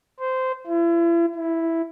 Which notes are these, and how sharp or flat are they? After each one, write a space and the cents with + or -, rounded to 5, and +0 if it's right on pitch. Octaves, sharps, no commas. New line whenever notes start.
C5 -15
E4 +40
E4 +0